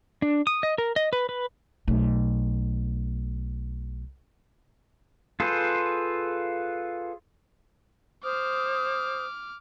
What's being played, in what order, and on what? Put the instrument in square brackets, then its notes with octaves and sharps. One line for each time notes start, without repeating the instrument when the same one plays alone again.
[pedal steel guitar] D4
D#6
D#5
A#4
D#5
B4
B4
[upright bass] B1 A3
[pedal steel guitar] F4 G#4 A4 B4 C5
[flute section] C5 D#6 [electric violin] D6 F6